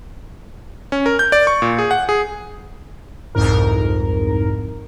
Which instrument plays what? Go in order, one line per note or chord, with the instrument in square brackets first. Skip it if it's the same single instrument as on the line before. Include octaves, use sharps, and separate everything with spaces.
[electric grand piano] C#4
A#4
G6
D5
C#6
A#2
G#4
F#5
G#4
[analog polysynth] C2 F2 G#2 A#4